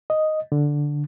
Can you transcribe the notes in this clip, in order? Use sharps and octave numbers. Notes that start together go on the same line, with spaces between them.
D#5
D3